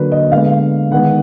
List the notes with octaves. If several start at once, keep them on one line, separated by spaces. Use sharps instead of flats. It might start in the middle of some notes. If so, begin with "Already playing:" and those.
Already playing: D3 F#3 A#3 A#4 B4
D#5
D3 G#3 B3 F5
D#3 G#3 B3 F#5